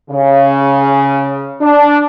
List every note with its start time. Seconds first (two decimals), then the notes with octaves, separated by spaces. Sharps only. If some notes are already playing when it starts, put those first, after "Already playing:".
0.11 C#3
1.61 D4